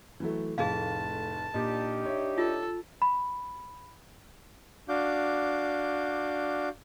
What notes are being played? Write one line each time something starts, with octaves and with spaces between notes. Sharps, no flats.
E3 F#3 A3
F1 A2 G#4 F5 A5
A#2 D4 D#4 G4
C#5 E5
F4 A4
B5
D4 F#4 F5 D6 G6